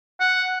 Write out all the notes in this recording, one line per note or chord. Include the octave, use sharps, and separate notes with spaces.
F#5